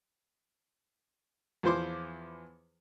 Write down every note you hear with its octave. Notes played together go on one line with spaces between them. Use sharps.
E2 E3 F3 C5 C6 D6